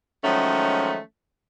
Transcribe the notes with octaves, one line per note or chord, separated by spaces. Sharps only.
D#3 F3 F#3 G#3 A3 C#4